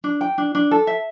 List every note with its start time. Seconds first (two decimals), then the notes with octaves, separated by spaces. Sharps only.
0.04 D4
0.21 G5
0.38 D4
0.55 D4
0.71 A4
0.87 E5